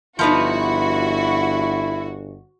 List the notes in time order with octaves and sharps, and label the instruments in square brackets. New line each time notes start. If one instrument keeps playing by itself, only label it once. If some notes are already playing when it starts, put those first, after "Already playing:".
[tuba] G1 [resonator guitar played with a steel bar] F3 B3 D#4 [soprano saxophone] E4 [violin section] F#4